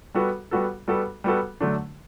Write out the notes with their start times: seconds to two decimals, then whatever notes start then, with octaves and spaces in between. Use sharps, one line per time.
0.14 G3 B3 F#4 A4
0.51 G3 B3 F#4 A4
0.88 G3 B3 F#4 A4
1.24 G3 B3 F#4 A4
1.61 D3 F#3 A3 D4